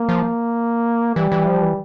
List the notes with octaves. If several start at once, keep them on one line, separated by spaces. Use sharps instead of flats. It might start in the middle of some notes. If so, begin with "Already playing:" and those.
Already playing: A#3
F3
E3 G3
E3
F3
E3